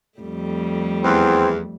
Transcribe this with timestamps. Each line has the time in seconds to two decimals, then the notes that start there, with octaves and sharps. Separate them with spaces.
0.18 F2 G3 A3
1.04 E2 C4